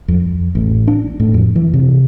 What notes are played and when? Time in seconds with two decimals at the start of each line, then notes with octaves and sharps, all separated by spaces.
0.08 F2
0.55 A1
0.87 D4
1.20 A2
1.34 F2
1.56 E3
1.74 C3